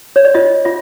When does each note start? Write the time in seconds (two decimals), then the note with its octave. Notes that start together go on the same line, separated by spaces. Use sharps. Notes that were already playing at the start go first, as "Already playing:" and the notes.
0.16 C#5
0.25 D5
0.34 F4 D#5
0.65 F4 E5